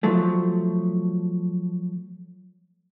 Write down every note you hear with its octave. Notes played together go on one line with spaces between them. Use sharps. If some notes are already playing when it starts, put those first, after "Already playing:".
F3 F#3 A3